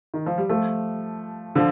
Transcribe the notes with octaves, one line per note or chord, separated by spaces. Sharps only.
D#3
F3
G3
F3 A3
D3 F3